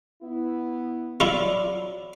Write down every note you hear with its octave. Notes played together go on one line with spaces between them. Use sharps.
B3 E4
F#3 E4 F4 D5